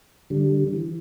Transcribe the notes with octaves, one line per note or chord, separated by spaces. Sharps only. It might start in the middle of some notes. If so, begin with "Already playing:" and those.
D3 G3
E3